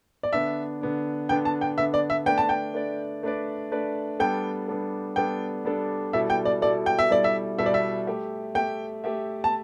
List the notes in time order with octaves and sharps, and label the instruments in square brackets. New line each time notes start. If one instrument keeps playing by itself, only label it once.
[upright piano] D5
[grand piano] D3 B3 D4 [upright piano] E5
[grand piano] D3 B3 D4
[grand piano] D3 B3 D4 [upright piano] G5
[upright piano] A5
G5
[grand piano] D3 B3 D4 [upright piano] E5
[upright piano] D5
E5
[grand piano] A3 D4 B4 D5 [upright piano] G5
[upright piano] A5
G5
[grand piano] A3 D4 B4 D5
A3 D4 B4 D5
A3 D4 B4 D5
[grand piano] G3 B3 D4 A4 [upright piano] G5
[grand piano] G3 B3 D4 A4
[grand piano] G3 B3 D4 A4 [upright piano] G5
[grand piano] G3 B3 D4 A4
[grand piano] B2 G3 E4 A4 [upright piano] E5
[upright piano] G5
D5
[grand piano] B2 G3 E4 A4 [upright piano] D5
[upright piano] G5
E5
[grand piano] B2 G3 E4 A4 [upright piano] D5
[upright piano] E5
[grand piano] B2 G3 E4 A4 [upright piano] E5
[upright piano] D5
E5
[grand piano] A3 G4 E5
[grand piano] A3 G4 E5 [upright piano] G5
[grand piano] A3 G4 E5
[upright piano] A5